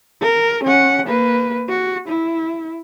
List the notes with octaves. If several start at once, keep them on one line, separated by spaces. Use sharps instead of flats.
A#4
C#4 F#5
A#3 B4
F#4
E4